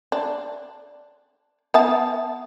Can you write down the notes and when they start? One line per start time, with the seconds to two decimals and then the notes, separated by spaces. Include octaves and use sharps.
0.12 D4
1.74 B3 E5 A5